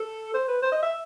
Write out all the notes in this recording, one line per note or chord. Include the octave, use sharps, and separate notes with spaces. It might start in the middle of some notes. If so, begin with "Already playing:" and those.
Already playing: A4
C5
B4
C5
D#5
E5